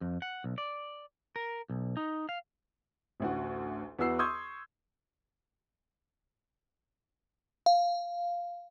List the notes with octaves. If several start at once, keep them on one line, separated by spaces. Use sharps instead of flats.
F2
F#5
B1
D5
A#4
B1
D#4
F5
A1 D2 F#4
E2 B3 F#4 E6 C7
C6 C#6 D#6 E6 G6 G#6
F5